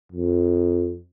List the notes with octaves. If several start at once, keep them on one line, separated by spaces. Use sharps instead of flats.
F2